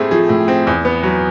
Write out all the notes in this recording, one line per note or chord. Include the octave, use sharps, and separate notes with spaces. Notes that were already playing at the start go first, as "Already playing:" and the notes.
Already playing: A2 A3 C4 G4 G#4
F3 G#4
A2
C4
E2
B3
F#3